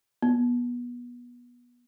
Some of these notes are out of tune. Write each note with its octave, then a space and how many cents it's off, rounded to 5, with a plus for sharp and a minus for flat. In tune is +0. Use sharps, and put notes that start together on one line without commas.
B3 -25